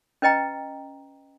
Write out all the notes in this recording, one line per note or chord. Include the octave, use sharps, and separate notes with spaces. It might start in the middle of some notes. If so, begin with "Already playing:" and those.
C#4 B4 D#5 G5 A#5